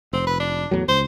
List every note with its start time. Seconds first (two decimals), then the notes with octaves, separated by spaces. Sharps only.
0.13 F1 C4
0.27 B4
0.40 D4
0.71 E2 A2 F#3
0.88 C#2 C5